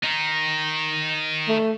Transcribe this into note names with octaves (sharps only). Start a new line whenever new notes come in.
D#3 D#4
A3